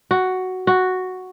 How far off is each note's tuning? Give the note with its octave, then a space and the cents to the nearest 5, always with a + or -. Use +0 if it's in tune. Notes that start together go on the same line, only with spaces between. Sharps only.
F#4 +5
F#4 +0